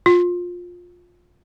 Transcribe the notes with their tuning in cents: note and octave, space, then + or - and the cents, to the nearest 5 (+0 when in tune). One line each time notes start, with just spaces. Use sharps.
F4 +20